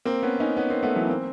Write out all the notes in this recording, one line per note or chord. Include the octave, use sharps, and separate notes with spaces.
A#3 C4
B3 C#4
C#4 D#4
B3 C#4
A#3 C4
A3 B3
E3 F#3
A#3 C4